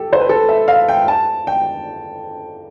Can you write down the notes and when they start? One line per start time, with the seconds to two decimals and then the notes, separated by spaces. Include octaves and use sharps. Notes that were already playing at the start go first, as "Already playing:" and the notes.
Already playing: G4 A4
0.13 C5
0.20 B4
0.29 A4
0.49 E5
0.68 F5
0.89 G5
1.08 A5
1.47 G5